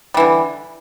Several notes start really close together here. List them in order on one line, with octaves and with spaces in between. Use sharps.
G3 E3 D3